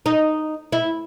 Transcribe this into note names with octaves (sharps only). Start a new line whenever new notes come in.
D#4
E4